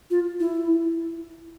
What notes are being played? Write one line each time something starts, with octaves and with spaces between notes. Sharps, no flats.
F4
E4